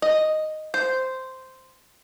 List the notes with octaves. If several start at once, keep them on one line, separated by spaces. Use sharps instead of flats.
D#5
C5